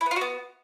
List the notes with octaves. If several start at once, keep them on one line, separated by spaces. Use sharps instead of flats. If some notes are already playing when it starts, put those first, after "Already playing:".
E4
B3
F4
F#4
B3